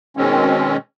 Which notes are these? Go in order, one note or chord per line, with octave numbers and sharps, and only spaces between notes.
B2 D#3 G#3 C4 C#4